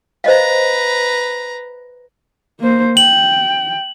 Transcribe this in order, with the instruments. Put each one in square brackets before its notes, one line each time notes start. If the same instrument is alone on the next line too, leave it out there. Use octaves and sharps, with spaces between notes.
[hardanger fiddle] B4 A#5 [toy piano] C5 D#5 F5
[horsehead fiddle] A#3 C5
[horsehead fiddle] G5 [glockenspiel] F#7